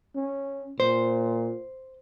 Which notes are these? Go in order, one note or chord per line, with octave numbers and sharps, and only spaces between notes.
C#4
A#2 C5